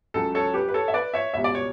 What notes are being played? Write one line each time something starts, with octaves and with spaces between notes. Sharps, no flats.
C#2 C#3 F#3 A4
A4 C#5
G4 B4
B4
A4 C#5
E5
B4 D5
C#5 E5
C#2 B2 G3 E5
D5
C#5